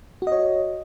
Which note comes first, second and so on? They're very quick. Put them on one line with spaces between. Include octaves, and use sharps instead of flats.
F#4 D#5 C#5